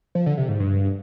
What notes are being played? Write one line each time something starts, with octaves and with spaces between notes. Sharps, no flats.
F3
D3
C3
G#2
G2